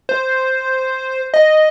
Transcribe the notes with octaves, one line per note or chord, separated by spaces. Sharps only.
C5
D#5